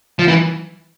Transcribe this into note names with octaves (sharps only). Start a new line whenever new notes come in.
F3
E3